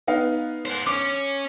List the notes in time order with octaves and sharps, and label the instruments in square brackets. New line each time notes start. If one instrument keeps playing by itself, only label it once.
[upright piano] B3 D#4 F5
[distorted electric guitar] C5 F#5
[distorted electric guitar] C#4 [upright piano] D6